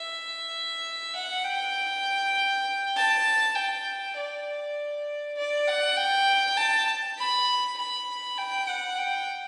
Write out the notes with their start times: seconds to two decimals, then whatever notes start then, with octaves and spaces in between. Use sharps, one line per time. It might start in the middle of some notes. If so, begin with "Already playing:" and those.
Already playing: E5
1.15 F#5
1.45 G5
2.96 A5
3.55 G5
4.17 D5
5.37 D5
5.67 F#5
5.96 G5
6.57 A5
7.18 B5
7.77 B5
8.38 G5
8.68 F#5
8.98 G5